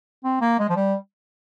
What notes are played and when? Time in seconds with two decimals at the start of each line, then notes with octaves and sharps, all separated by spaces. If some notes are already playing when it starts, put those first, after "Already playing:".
0.24 C4
0.41 A#3
0.59 G#3
0.69 F3
0.76 G3